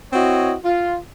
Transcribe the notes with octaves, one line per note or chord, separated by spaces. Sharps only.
C4 E4 F#4 C#5 D#5
F4